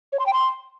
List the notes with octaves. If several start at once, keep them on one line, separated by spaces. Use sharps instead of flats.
C#5
C6
G5
C6